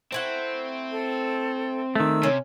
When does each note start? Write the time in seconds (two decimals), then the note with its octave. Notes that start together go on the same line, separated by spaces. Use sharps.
0.12 A3 C4 E4 F#5
0.92 A4
1.95 D#3 A3 E6
2.23 C3 C#4